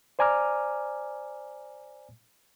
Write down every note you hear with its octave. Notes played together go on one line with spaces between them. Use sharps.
C5 D5 G#5 A#5 D6 F6